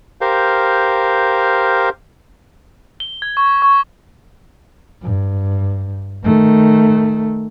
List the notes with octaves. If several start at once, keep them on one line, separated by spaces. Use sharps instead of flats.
G4 A#4 C5 F5
G7
G#6
C#6
C#6
G2
D#3 A3